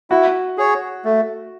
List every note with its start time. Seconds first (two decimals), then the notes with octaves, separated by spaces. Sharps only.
0.10 E4 F#4
0.58 G#4 C#5
1.04 A3